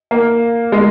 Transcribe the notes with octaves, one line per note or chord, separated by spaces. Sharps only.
A#3
G#3